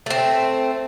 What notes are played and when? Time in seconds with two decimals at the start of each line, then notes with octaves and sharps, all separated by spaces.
0.06 A3 C4